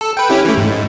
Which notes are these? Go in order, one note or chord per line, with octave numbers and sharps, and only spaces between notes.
A4
B4 G5
C#4 E4 G4
E3 A3
G#2